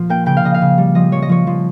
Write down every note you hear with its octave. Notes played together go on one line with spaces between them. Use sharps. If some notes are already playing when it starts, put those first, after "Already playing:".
Already playing: A#2 F3
A#3 G5
C#3 G5
F5
C#3 D#5
F5
C#3
G3
F3 D#5
F3 C#5
D#5
F3 C#5
F3